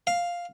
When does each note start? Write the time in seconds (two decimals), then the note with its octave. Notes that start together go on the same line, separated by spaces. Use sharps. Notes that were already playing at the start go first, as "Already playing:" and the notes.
0.07 F5